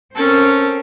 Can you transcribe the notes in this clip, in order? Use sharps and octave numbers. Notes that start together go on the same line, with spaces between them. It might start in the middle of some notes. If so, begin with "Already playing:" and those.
C4 C#4 A4 A#4